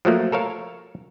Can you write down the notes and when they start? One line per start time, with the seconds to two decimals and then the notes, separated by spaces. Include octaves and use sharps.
0.05 F3 F#3 A3 A#3
0.32 A4 A#4 C#5 F5